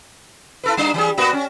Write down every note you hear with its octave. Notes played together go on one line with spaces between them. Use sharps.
E4 A4 B4
G3 D4 D#4
E3 G3 G#4
A#3 B3 F#4
C#4